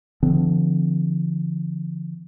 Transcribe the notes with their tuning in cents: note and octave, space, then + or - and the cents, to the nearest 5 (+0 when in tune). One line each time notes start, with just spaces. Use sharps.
D3 +0 F3 -30 C4 -40